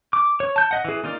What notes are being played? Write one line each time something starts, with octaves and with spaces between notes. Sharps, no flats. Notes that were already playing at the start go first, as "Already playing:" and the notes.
D6
C#5
A5 G6
D#5 F#5
E3 G#4
A#3 D#4 F4 D5